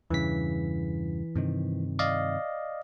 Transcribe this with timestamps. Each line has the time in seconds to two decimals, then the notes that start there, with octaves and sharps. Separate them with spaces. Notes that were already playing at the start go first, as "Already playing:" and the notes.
0.10 E2 G2 C#3 E3 B6
1.35 G2 C3 D#3
1.99 D5 D#5 F5